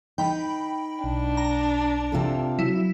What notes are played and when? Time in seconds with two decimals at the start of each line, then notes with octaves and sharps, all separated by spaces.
0.18 D#4 B4 G5 B5
1.04 B1 D4
1.37 A#5
2.12 C3 F4 A4
2.59 F#3 E4